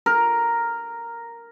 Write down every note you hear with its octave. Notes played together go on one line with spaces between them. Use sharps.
A#4